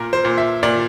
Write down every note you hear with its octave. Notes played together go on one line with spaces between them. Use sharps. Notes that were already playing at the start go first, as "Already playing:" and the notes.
Already playing: A#2 A#4
C5
A#2
E5
A#2 D5